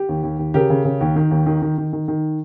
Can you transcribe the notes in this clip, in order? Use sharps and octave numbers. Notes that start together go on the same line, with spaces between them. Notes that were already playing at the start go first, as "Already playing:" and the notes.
Already playing: G4
D#2
D#2
D#2
C#3 G4 A#4
C#3
C#3
D#2
D#3
D#2
D#3
D#3
D#3
D#3
D#3